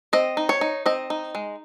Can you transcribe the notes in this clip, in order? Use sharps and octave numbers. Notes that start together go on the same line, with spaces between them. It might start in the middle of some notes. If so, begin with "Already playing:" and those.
C4 D#5
D#4
C#5
D#4
C4 D#5
D#4
G#3